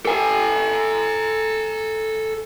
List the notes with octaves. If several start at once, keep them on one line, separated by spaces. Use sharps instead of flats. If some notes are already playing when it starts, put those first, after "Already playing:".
A4 G#5